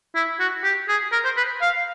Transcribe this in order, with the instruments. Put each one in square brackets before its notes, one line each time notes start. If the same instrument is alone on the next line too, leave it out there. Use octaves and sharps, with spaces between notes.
[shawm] E4
F#4
G4
G#4
A#4
C5
B4
F5